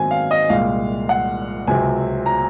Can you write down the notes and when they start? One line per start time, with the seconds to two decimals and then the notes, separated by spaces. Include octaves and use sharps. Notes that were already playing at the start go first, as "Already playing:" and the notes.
Already playing: G#2 D#3 F#3 C4 G#5
0.11 F5
0.31 D#5
0.49 C2 A#2 G#3 F5
1.09 F#5
1.67 C#2 C3 F#3 C4 G#5
2.26 A#5